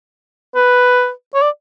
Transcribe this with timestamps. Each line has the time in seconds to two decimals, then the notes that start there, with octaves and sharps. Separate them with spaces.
0.55 B4
1.34 C#5
1.42 D5